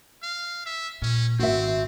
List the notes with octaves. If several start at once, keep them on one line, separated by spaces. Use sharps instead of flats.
F5
E5
A#2 C#4
G#1 D#3 C4 F#4 E5